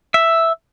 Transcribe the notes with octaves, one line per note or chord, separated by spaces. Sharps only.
E5